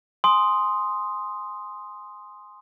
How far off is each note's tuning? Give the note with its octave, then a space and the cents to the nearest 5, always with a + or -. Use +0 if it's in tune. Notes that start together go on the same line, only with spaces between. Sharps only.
G#5 +0 C6 +0 D#6 +0